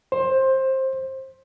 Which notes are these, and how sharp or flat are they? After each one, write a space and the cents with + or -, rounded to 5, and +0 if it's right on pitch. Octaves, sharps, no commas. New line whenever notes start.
C5 +15